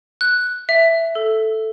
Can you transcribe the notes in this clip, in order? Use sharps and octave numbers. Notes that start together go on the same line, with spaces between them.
F#6
E5
A4